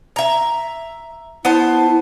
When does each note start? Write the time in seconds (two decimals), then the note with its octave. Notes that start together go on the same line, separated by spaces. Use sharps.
0.16 E5 A#5
1.45 B3 E4 C5 A5